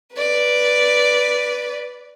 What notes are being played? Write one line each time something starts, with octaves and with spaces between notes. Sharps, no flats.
B4 D5